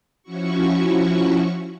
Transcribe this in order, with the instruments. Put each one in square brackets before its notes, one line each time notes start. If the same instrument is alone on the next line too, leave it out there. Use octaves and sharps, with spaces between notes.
[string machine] F3 C#4 E4 F#4 C#6